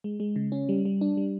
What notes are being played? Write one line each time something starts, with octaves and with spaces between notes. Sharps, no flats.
G#3
G#3
C#3
C#4
G3
G3
D4
G3